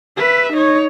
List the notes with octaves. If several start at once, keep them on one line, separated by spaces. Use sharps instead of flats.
B4 E5
D#4 C#5